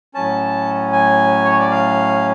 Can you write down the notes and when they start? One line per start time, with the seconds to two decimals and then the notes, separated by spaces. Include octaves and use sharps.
0.14 A2 F#3 C#4 A5
0.93 G#5
1.45 C#5
1.59 D5
1.71 F5